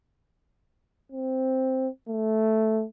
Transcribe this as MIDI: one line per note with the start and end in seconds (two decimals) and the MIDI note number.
1.12 1.88 60
2.09 2.85 57